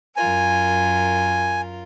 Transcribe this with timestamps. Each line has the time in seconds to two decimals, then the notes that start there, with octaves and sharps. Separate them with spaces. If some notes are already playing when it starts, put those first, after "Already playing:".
0.16 F#2 F4 A#4 G#5